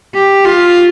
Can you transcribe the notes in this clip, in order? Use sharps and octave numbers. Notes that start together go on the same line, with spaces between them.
G4
F4